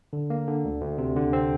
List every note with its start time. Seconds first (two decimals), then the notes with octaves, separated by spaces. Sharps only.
0.13 D3
0.30 A#3
0.47 D3
0.65 D2
0.82 D2
0.98 C3
1.16 D3
1.33 C4